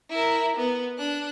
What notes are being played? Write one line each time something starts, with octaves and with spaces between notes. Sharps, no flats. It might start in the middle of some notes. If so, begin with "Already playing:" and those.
E4 A#4
B3
D4 F#6